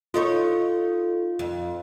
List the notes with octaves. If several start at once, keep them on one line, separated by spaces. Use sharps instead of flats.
D#4 F4 A4 C#5
F2